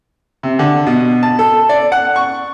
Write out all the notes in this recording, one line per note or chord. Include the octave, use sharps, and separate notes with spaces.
C3
D3
B2
A5
A4
D5
F#5
C#6